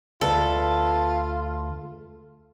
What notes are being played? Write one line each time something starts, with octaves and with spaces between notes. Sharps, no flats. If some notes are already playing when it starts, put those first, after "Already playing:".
D2 F4 A4 B4